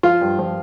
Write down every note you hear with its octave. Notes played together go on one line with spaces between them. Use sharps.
F3 F4
G2
F3